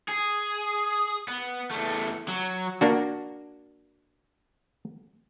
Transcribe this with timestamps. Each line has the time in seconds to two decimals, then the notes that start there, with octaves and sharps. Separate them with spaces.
0.08 G#4
1.28 B3
1.71 E2 A3
2.28 F#3
2.81 A#3 D4 F#4